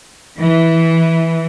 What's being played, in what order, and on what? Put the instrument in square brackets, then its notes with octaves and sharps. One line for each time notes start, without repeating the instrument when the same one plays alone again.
[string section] E3